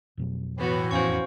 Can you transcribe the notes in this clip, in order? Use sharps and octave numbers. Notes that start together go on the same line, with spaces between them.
F2 B2 F#3
A2 E3 B3 F#4
E1 F2 B3 C#4 F#4 C5 F5 C#6